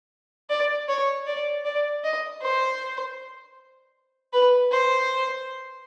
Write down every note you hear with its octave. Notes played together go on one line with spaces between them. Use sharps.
D5
C#5
D5
D5
D#5
C5
B4
C5